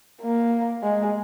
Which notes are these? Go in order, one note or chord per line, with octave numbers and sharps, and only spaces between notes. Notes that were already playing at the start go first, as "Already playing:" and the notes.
A#3
G#3